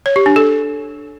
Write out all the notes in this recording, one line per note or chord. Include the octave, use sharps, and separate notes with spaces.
C#5
G4
D4
A4